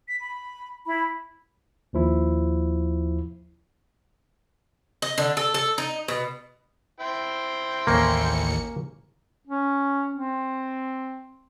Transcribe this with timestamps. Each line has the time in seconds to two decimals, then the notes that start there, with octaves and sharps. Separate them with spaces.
0.08 B6
0.21 B5
0.86 E4 B5
1.93 D#2 F3 E4
5.02 D#5
5.18 D3
5.37 A4
5.54 A4
5.78 D#4
6.08 B2
7.00 E4 C5 G5
7.87 A1 D#2 A#3 C#4 C#7
9.47 C#4
10.14 C4